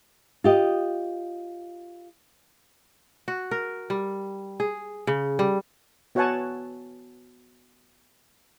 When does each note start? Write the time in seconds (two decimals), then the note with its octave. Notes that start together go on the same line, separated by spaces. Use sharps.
0.44 F4 G4 D#5
3.28 F#4
3.51 A#4
3.90 G3
4.60 G#4
5.07 C#3
5.39 G3
6.15 B3 F#4 C#5 F#5 G#5 A5